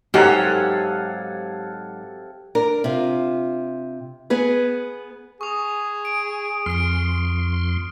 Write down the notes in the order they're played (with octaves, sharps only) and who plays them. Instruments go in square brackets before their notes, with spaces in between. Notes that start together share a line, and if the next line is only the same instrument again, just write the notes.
[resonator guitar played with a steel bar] G#2 F#3 [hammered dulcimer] C3 A4 G#5 [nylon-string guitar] G4 [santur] F5 F#5
[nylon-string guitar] D4 A#4
C3 F4
B3 G#4 B4
[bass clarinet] G#4 [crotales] C#6 D#6
[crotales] D7
[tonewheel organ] F2 C6 [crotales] F6 D7